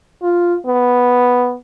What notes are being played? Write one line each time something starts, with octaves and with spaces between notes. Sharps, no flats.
F4
B3